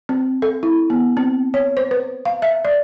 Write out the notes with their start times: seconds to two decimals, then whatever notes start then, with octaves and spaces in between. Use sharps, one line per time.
0.09 C4
0.42 A4
0.63 E4
0.90 B3
1.17 C4
1.54 C#5
1.77 C5
1.91 B4
2.25 F5
2.42 E5
2.65 D5